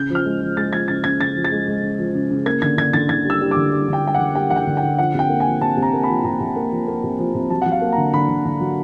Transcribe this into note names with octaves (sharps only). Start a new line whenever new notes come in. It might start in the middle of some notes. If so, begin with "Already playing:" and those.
Already playing: C#3 G6
F3
F6
G#3
F3
G#3 A6
F3 G#6
C#3 A6
C#3 G#6
C#3 A6
F3
A6
G#3
G#3
C#3
F3
C#3
C#3
A#3 G#6
D3 G#6
D3 G#6
D3 A6
D3 G#6
G3
E6
G3
D6
D3
G3
D3
G5
G3 G5
D3 F#5
G3 G5
D3 F#5
G5
D3
G5
D3
F3 F#5
C3 G5
A#3
G#5
F3
C3 A5
C3
A#5
A#3
B5
F3
C3 A#5
C3
A#3
F3
A#3
C3
F3
C3
F#3 A5
F#3 F#5
F5
A#3
A#5
D3
D3 B5
D3
D3
F#3